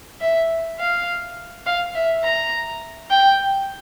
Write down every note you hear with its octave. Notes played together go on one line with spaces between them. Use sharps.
E5
F5
F5
E5
A#5
G5